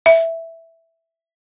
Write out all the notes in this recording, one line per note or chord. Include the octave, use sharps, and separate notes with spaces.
E5